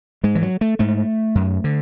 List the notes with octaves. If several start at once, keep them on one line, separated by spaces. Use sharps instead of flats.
G#2 G#3
E3
F#3
A3
G#2 A3
F#2
D3